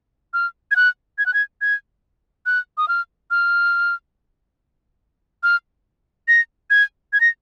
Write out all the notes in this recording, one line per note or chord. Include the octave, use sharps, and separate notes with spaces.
F6
G#6
F#6
G#6
F#6
G#6
G#6
F#6
D#6
F6
F6
F6
A#6
G#6
G#6
A#6